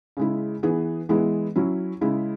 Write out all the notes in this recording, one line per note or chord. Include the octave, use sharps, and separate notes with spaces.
C#3 G#3 E4
E3 B3 G#4 B4
E3 G#3 B3 E4 G#4
F#3 C#4 E4
C#3 G#3 E4